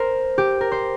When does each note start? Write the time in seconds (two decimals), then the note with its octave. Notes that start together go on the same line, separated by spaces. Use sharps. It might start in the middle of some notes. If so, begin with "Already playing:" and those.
Already playing: A#4 C5
0.38 G4
0.61 A#4
0.72 C5